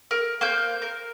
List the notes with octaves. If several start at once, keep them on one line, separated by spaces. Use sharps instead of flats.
A#4
A#3 C5 G6
A#4